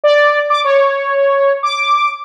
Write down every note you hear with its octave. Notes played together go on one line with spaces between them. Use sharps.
D5
D6
C#5
D6